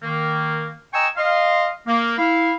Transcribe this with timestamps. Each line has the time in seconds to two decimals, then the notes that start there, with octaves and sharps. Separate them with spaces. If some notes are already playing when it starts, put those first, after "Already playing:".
0.01 D#3 A#3
0.93 D#5 G5 G#5 A#5 C#6 E6
1.16 D#5 F5 C6
1.86 A#3
2.18 E4 F5